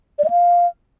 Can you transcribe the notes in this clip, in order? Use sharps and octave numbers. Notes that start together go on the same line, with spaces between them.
D5
D#5
F5